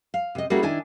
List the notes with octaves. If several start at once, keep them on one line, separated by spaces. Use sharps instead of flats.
F5
C3 D#5
G3 A#3 C#4 E4 F#4 G#4
D#3 D4 E4 G#5